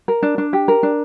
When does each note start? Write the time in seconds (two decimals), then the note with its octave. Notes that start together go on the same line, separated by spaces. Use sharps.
0.08 A#4
0.23 D4
0.38 D4
0.53 G4
0.68 A#4
0.83 D4